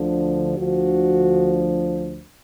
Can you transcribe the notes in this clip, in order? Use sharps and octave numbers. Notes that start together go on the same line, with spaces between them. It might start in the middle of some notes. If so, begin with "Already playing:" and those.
Already playing: D2 D3 F3
D2 D3 F3 F#4